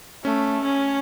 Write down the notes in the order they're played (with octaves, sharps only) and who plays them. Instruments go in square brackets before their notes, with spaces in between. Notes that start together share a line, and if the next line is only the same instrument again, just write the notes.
[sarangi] A3 [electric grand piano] C#4
[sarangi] C#4